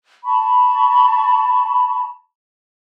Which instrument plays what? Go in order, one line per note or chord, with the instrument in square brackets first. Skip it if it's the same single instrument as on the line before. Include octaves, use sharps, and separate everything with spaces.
[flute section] A5 B5 C#6